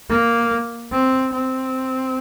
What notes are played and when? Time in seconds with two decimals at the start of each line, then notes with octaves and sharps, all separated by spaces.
0.09 A#3
0.91 C4
1.33 C4